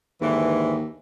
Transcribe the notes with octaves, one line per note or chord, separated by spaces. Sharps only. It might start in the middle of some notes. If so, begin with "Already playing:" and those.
D#2 G#2 D3 E3